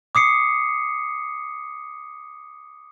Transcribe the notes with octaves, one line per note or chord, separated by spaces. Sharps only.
D6 D#6 C7 C#7